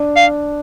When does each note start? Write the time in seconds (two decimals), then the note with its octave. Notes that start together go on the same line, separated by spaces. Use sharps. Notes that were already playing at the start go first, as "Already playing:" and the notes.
Already playing: D4
0.16 F5